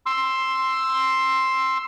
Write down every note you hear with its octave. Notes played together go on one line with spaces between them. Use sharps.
C6 E6